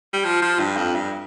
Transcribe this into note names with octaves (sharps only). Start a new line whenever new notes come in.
G3
F3
F3
G2
F2
G2